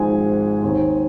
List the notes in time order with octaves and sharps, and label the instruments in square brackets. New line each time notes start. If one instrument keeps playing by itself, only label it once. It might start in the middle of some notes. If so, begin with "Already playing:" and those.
Already playing: [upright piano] G#1 G#2 F3 G#3 C4 G#5
D#2 D#3 C4